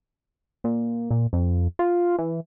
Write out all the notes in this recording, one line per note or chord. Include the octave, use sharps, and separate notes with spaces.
A#2
A#2
F2
F4
E3